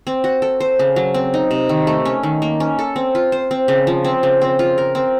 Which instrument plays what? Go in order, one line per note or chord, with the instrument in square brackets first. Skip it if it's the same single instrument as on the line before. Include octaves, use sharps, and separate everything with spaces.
[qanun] C4
F#4
A4
C5
C#3
F#3
C4
D#4
C3
D#3
A3
C#4
D#3
A#3
C#4
A4
C4
F4
C5
C4
C#3
F3
C4
C#3
C4
F4
A#4
C4